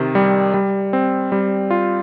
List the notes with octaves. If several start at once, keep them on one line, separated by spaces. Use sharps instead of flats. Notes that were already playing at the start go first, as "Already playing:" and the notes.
Already playing: C3 D#3
G3
G3
C4
G3
F4